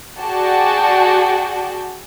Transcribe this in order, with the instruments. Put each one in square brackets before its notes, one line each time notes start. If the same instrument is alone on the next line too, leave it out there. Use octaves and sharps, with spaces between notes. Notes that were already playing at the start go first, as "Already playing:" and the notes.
[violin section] F#4 G#4 D5 G5 A5